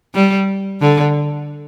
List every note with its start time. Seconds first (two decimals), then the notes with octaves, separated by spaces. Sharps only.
0.14 G3
0.81 D3